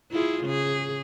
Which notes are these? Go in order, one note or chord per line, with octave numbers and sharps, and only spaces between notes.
E4 F4 G#4
C#3 G#4